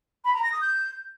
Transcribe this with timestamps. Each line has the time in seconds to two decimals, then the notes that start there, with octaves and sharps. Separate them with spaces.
0.24 B5
0.33 A#5
0.43 A#6
0.52 D#6
0.61 G6